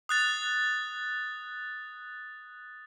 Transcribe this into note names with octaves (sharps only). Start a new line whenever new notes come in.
D#6 F#6 A6